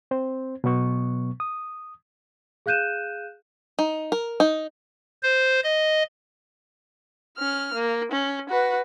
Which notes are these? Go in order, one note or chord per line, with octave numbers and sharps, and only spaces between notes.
C4 C5
B2 F#3 B3 C#6
D#6
G#4 F5 F#6 G6 D#7 E7
D#4
A#4
D#4
C5
D#5
C#4 F6
A#3
C#4
F#4 B4